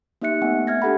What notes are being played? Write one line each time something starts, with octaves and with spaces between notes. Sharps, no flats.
A#3 D#4 G4 E5 F#6 C#7
A3 B3 C4 F#5 G#5
E5 F6 G#6 A#6
D4 G4 A4 F#5 B5